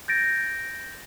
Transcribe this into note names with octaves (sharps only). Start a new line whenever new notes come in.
G6 A6 A#6 D7